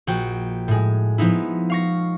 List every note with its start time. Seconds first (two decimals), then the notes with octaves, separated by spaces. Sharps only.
0.07 A#1 F#4 G5
0.68 A2 G#3
1.18 F3 B3 D#4 E4
1.70 F5 C#6 A#6